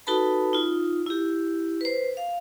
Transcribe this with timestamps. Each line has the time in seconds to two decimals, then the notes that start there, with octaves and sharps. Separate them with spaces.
0.07 D#4 F#4 A4 B4 A5 B5
0.53 D#4 F4
1.06 E4 G4
1.81 B4 C5
2.17 F5